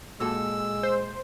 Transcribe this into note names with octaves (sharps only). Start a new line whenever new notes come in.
A#2 G#3 F#4 A4 E6
C5